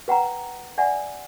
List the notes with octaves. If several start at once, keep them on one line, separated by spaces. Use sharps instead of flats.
B4 F#5 G5 A#5
D5 E5 F#5 G#5